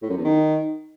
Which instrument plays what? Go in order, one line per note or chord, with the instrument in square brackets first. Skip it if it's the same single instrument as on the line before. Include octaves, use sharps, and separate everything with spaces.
[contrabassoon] A2
F#2
E2
D#3